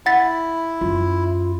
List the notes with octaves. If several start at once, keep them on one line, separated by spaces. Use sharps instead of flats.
E4 F#5 A6 B6
F#2 F4